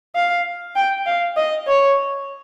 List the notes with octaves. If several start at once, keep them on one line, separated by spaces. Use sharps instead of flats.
F5
G5
F5
D#5
C#5